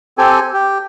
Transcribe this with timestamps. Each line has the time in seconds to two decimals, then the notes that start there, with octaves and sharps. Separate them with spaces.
0.18 C4 G4 A4 G#5
0.54 G4